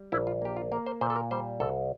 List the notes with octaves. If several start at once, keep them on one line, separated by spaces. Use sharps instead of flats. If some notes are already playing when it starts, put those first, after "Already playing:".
Already playing: G3
A#1 E4
F4
A#3 G4
F4
A#3 A#4
C5
A#2 C5
A4
A#4
G3 C5
C2 A4